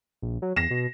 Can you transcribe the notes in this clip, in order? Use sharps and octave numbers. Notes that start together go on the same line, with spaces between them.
A#1
F#3
E2 A#6 C7 E7
B2